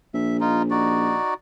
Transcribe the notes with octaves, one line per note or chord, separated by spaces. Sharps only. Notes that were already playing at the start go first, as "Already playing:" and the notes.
A#1 E5
D#4 F4
D#4 F#4 D5